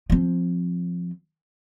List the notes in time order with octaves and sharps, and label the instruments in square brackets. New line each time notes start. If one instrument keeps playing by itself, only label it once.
[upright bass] F3 C4